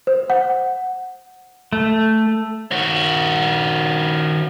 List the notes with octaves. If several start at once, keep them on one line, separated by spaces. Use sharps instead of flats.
C5
F#5
A3
D#3 F#4